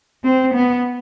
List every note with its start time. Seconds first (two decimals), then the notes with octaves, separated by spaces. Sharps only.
0.24 C4
0.54 B3